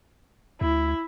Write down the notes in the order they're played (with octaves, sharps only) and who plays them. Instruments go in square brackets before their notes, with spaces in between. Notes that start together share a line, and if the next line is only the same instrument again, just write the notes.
[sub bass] D2 [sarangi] E4